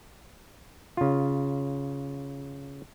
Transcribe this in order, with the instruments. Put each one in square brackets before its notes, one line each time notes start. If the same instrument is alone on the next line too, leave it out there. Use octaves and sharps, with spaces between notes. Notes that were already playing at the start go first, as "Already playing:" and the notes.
[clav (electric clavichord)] C#3 F4